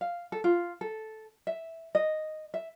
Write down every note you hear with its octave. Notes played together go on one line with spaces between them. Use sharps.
F5
A4
F4
A4
E5
D#5
E5